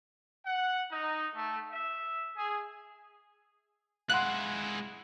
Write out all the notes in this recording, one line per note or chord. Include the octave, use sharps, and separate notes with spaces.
F#5
D#4
A3
E5
G#4
G#3 E4 F5 F#5 C6 F#6